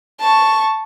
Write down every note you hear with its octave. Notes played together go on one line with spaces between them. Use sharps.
A5 C#6